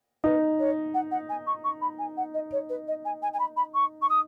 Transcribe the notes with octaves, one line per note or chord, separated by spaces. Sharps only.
D#4 B4
C#5
F#5
F#5
G#5
C#6
C#6
B5
G#5
F#5
D#5
C#5
B4
D#5
G#5
G#5
G#5
B5
B5
C#6
C#6
D#6